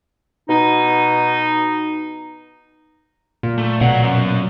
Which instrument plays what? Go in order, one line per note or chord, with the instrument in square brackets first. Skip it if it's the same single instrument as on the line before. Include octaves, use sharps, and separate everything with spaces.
[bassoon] B2 [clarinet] D#4
[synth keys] A#2
[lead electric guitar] A3
[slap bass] B2 [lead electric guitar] F#3 F#5
[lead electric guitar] F#3 C#4